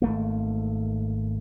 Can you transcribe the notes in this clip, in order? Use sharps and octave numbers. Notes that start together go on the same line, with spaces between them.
G#1 A3 A#3